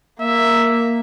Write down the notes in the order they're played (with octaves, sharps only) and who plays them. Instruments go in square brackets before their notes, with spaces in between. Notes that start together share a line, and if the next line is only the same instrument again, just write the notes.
[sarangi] A#3 [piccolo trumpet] E5